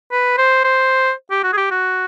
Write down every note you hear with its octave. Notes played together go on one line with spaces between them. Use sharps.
B4
C5
C5
G4
F#4
G#4
G4
F#4